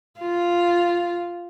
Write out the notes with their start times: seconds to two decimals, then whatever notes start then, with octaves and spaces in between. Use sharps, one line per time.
0.19 F4